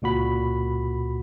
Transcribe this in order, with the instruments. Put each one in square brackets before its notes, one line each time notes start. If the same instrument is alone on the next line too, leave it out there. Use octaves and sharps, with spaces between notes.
[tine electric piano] C#2 A#2 F#4 B5